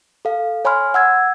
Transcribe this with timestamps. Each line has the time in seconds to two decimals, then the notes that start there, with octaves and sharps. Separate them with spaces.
0.25 A4 F5
0.65 C#5 G#5 B5 C6 F6
0.94 F#5 E6 G#6